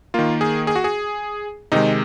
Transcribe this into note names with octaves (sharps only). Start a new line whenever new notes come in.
D#3 A#3 F4
G#4
G#4
F#4
G#4
C3 D#3 G#3 D#4